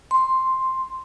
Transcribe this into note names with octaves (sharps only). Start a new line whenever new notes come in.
C6